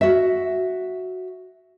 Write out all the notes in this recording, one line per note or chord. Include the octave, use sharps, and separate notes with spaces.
F#4 E5